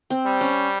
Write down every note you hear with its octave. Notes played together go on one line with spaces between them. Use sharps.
C4
G3
C#4